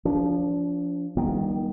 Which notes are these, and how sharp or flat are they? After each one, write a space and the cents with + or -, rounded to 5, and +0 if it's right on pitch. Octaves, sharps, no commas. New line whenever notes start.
F3 +0 D4 -35
D#3 +0 G3 +0 B3 -45